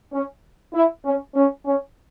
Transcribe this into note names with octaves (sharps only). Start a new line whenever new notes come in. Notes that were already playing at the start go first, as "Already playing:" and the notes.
C#4
E4
C#4
C#4
C#4